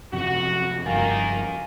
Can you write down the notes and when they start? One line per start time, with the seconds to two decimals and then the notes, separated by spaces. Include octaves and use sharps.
0.13 F#2 C3 F3 F#4
0.86 F#1 G2 D#3 F3 A#3 F5 G#5 A6